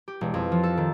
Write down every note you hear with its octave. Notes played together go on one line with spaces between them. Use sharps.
G4
E1
F2
F3
A4
D#3